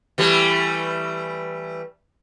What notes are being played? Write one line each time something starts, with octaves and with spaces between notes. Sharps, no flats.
E3 G3 A3